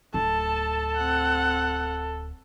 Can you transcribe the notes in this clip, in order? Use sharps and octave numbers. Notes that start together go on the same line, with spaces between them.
D1 A4 A5
C4 F#5